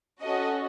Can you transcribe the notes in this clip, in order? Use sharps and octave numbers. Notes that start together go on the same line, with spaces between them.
C#4 F#4 A4 D#5